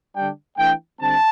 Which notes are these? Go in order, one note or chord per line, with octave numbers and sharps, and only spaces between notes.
D3 G3 D4 G5
E3 A3 D4 G5
D3 G3 C4 A5